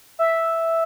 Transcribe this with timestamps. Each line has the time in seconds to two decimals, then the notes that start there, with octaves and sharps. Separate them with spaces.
0.19 E5